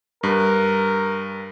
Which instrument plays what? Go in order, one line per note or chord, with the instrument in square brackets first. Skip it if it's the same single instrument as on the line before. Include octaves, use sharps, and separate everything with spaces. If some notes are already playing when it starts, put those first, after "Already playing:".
[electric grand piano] G2 [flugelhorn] A#4